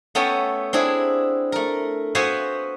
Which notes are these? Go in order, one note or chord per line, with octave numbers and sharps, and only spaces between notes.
A3 B3 C#4 A4 G5
C4 D4 E4 G#4
A3 A#4
B3 F#4 C5 E5 F5 G#5